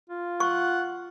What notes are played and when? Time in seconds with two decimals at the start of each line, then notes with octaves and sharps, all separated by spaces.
0.10 F4
0.40 F#5 C#6